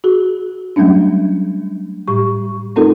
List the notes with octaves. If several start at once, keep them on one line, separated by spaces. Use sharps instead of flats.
F#4 G#4
F#3 G3 A3 C#4 D4
A2 G3 G4 C#6
A3 C4 D#4 F4 A4 A#4